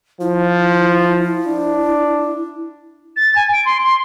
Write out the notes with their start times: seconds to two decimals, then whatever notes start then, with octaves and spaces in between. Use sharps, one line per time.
0.21 F3 E4
1.47 D4
3.16 A6
3.36 G#5
3.53 D7
3.65 C6
3.84 C6